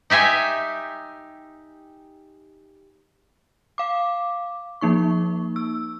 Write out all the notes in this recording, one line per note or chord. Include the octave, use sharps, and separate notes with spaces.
D#4 G4 E5 G#5 C6
F5 D6
F3 A#3 D#4 C#6
E6